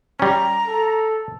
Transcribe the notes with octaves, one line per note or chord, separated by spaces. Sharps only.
G3 C#4 A#5
A4